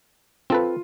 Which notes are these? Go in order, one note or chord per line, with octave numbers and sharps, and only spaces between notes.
C4 F4 A4 B4